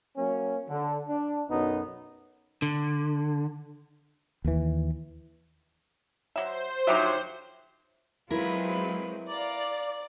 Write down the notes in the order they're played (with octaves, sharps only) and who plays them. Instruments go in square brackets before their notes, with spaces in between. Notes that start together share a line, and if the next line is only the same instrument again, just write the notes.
[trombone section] F#3 A#3 C#4
D3
D4
B1 F#2 B3 D#4
[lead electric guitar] D3
[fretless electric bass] D#2 E3
[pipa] F#3 E5 [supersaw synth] C5
[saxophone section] D2 F3 F#3 [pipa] D#4 G4 E5
[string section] F#3 G#3 C4 [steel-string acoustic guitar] E4 A#4 [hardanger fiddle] F4 B4
[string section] D5 [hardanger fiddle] F5 A#5